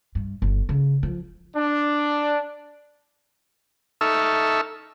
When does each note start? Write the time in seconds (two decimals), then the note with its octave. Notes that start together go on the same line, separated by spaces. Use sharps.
0.15 G2
0.42 G1
0.69 C#3
1.03 F3
1.55 D4
4.01 D#4 A4 E5 C#6 E6 F6